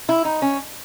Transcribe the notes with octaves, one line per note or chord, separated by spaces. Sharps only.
E4
D#4
C#4